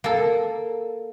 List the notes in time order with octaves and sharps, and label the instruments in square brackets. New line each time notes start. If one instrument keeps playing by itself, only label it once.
[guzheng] A#3 A4